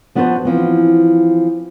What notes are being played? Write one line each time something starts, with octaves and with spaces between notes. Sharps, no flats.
F3 B3 D4 F#4 A#4 C5
E3 F3 C4